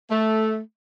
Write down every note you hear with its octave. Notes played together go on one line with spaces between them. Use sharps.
A3